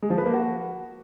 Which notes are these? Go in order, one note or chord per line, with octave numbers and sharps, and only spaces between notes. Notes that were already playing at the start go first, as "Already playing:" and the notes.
G#3
F3
B4
A#3
F#4